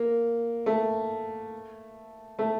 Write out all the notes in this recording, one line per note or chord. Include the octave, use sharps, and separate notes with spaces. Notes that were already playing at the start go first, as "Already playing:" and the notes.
Already playing: A#3
A3
A3